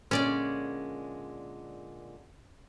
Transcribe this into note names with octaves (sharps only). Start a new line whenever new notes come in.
A#2 D3 G#3 C#4 D5